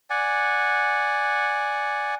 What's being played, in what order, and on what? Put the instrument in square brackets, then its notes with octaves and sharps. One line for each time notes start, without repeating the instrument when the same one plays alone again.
[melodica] D5 F#5 G#5